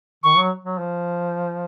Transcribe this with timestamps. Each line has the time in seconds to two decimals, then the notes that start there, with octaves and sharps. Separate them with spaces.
0.24 D#3 C#6
0.37 F#3
0.65 F#3
0.79 F3